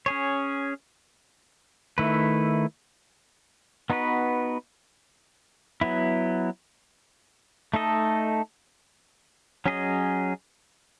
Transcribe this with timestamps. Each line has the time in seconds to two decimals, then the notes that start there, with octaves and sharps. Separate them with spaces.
0.06 C#4 G#4 C#5
1.98 D#3 A3 E4 B4
3.90 B3 D#4 F#4 B4
5.81 F#3 B3 E4
7.74 A3 D#4 A4 D#5
9.66 F#3 C#4 G#4 D#5